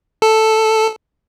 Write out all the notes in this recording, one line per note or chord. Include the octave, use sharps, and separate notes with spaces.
A4